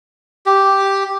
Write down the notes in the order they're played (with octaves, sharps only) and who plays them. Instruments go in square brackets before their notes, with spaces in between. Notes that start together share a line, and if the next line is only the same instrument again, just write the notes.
[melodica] G4